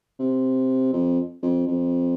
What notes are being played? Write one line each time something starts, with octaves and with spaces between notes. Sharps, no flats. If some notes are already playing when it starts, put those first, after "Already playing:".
C3
F2
F2
F2